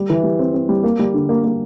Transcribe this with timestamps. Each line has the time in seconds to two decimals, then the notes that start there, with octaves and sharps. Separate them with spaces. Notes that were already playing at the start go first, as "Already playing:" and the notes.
Already playing: G3
0.10 E3
0.24 G3
0.39 C4
0.54 C4
0.69 G3
0.83 A#3
0.99 G3
1.14 D3
1.29 A#3
1.44 A#3